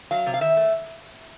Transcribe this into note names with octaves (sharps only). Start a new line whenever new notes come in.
F#3 F5
C3
F5
D#3 E5
A3